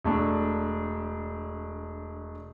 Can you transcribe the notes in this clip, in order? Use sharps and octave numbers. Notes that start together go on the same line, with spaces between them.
E1 A3 D4